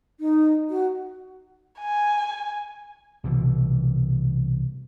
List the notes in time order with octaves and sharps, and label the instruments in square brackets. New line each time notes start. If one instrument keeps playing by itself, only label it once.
[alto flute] D#4
F#4
[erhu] G#5
[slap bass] C2 B2 E3